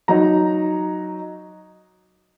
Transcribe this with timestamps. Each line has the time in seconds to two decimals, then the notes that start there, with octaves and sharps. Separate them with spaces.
0.08 F#3 D#4 A#5